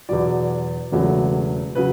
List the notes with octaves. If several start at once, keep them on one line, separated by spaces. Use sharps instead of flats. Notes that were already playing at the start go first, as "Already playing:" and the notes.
E2 B2 F#3 D5
E1 E2 C#3 F#3 A3
C#3 F#3 B4